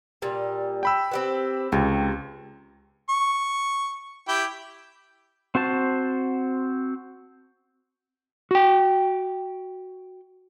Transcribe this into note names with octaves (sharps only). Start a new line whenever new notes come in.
A#2 G3
G5 B5 E6
C4 G4 B4
C#2 C3
C#6
E4 G4 G5
C4 F#4 C5 A5
F#4 G5